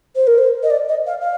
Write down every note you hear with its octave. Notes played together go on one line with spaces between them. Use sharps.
C5
A#4
C5
D#5
D5
D#5
F5
F5